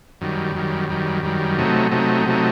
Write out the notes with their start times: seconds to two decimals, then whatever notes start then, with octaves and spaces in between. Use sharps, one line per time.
0.21 F#2 D#3 G3
0.55 F#2 D#3 G3
0.89 F#2 D#3 G3
1.23 F#2 D#3 G3
1.58 C3 F#3 A3 D#4
1.91 C3 F#3 A3 D#4
2.26 C3 F#3 A3 D#4